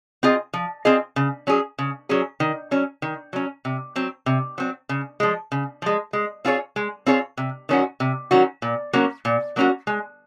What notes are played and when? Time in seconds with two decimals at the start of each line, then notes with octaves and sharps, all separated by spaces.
0.23 C4 F4 G#4 D#5
0.53 F3
0.85 C4 F4 G#4 D#5
1.16 C#3
1.47 F#3 C#4 G#4
1.79 C#3
2.09 F#3 C#4 G#4
2.40 D#3
2.71 F#3 C#4
3.02 D#3
3.33 F#3 C#4
3.65 C3
3.96 F#3 C4
4.26 C3
4.58 F#3 C4
4.89 C#3
5.20 F3 G#3
5.52 C#3
5.82 F3 G#3
6.13 G#3
6.45 C4 F4 G#4 C#5
6.76 G#3
7.06 C4 F4 G#4 C#5
7.37 C3
7.69 D#3 F#3 C#4 F#4
8.00 C3
8.31 D#3 F#3 C#4 F#4
8.62 A#2
8.93 F#3 A#3 C#4 F#4
9.25 A#2
9.56 F#3 A#3 C#4 F#4
9.87 G#3